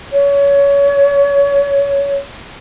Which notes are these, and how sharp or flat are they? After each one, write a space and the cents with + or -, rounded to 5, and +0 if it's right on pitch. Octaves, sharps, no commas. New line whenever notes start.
C#5 +25